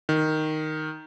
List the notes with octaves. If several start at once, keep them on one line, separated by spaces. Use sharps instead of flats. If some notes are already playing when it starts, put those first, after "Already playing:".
D#3